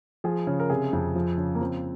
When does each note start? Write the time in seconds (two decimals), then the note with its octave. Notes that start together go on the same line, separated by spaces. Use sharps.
0.24 F3 G#4
0.47 C#3
0.60 A#4
0.70 C3 G#4
0.93 F2
1.15 F3
1.38 C#3
1.55 A#3
1.60 F3 C4